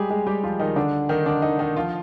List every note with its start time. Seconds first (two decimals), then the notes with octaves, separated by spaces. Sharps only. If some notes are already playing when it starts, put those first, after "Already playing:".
Already playing: G3 G#3 G4 G#4
0.10 G#3 G#4
0.27 G3 G4
0.43 F3 F4
0.60 D#3 D#4
0.76 D3 D4
1.09 D#3 D#4
1.26 D3 D4
1.42 D#3 D#4
1.59 D#3 D#4
1.76 F3 F4